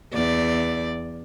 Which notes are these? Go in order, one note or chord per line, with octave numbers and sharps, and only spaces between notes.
E2 D5